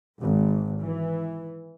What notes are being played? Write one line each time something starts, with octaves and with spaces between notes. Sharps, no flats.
G#1
E3